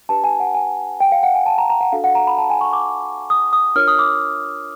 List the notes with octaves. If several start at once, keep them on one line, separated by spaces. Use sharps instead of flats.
D4 G4 B4 A5
G#5
F#5
G#5
G5
F5
F#5
G#5
A5
A#5
A#5
F#5
D4 F#4 A4 F5
F#5
A#5
B5
A5
G#5
C#6
D6
D#6
D#6
D4 F4 A#4 C#5 F6
D#6
D6